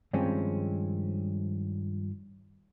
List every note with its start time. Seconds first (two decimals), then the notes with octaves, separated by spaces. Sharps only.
0.13 G2 D#3 F3 G#3 C4 C#4